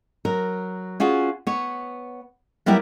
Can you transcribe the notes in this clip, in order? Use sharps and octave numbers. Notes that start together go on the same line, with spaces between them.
F#3 A#4
C#4 F4 F#4 G#4
B3 C#5
F#3 G3 B3 E4 G4 A#4